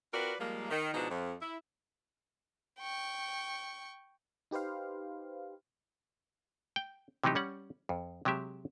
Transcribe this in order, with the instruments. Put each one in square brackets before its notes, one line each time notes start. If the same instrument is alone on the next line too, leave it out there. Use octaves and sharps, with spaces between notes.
[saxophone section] C4 F4 F#4 A#4 B4 D5
F3 G3 G#3 A#3
D#3
G#2 B2 F3 B3 D4 D#4
F2
E4
[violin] G5 C#6
[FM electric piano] D#4 G4 B4 C5 F5
[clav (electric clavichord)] G5
C3 E3 F#3 D#4 G4
G3 C#4 F#5
F2
C3 F#3 G#3 G4 E5